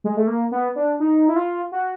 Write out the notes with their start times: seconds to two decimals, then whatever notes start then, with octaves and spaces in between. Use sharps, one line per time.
0.04 G#3
0.17 A3
0.27 A#3
0.51 B3
0.76 D4
1.00 D#4
1.28 E4
1.36 F4
1.72 F#4